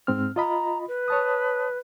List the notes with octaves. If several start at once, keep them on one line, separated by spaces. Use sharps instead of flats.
G#2 C4 F6
F4 D#5 A#5 B5
B4
C#5 A5 D#6